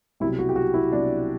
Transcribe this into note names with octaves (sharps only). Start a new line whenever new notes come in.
C2 B2 F#3 E4
F#4
G4
F#4
E4
C2 B2 F#3 D4